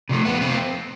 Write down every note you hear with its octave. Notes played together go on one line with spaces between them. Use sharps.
C3 F3 A3
F2 B3
C3 F3 A3 C4